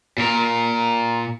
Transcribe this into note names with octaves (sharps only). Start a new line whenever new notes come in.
A#2 A#4